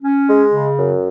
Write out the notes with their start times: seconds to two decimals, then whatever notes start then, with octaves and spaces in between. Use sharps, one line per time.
0.03 C#4
0.28 G#3
0.54 C#3
0.78 F#2